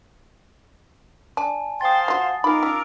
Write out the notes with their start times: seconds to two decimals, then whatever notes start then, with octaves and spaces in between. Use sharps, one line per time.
1.37 D4 G#5 A5
1.81 C5 F5 G5 C6 D#6 A6
2.08 F#3 F4 F#5
2.44 B3 D#4 F4 A#4 B5 D6
2.63 C#4 E6